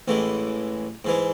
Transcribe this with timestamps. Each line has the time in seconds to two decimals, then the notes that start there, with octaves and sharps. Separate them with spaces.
0.08 A1 A2 E3 G#3
1.05 G#2 E3 G#3